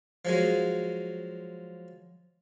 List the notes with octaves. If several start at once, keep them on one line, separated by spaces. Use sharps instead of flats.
F3 F#3 G#3